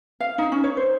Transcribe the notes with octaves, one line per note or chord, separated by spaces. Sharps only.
F5
D#4
C#4
C#5
C5